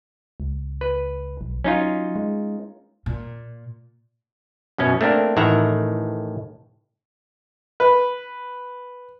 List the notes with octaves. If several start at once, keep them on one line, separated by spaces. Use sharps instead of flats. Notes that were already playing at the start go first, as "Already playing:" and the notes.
C#2
B4
B1
F#3 C#4 D#4 F4
G#3
A#2
F#2 B2 C#4
A3 A#3 C4 D4 A#4
A1 A2 D#3 E5 F#5 A#5
B4